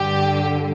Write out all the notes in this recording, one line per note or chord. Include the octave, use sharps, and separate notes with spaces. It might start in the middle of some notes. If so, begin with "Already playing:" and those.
Already playing: G2 D3 G4